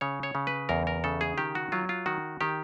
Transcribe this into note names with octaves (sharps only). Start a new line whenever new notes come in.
C#3 C#5
C#5
C#3
B4
E2 A#4
A#4
C#3 A4
G#4
D#3 G4
F#4
F#3 F4
F4
D#3 F#4
D#3 G4